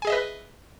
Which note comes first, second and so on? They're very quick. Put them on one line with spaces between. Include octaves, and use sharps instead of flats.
G#5 G#4 D#5 E5 B4